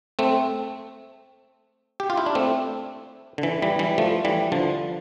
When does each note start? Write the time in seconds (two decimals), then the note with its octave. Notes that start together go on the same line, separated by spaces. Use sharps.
0.19 A3 C4
2.00 G4
2.10 F4
2.17 E4
2.26 D4
2.35 A3 C4
3.38 D3
3.43 E3
3.62 E3 G3
3.79 E3 G3
3.98 F3 A3
4.25 E3 G3
4.52 D3 F3